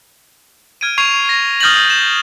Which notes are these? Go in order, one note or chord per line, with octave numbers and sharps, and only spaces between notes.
F6 G#6 D7 D#7
C#6 G#6 C7 F7
A#6
D#6 F6 G6 A6 A#6 F#7
G6 E7